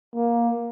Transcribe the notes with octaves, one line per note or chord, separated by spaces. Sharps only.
A#3